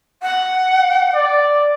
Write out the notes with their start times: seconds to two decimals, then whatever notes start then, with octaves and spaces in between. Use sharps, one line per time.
0.22 F#5
1.15 D5